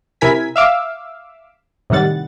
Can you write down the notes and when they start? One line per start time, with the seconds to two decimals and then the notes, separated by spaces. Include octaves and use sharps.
0.21 C3 E4 A#4 G#5 G#6 B6
0.56 E5 F5 D6 E6
1.90 A2 C3 D#3 G3 F#5 A6